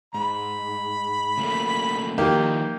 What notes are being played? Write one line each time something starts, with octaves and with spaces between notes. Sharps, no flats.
G#2 B5
C#3 A3 A#3
D#3 F3 A#3 D#4 G4